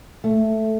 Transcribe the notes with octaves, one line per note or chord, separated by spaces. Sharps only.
A3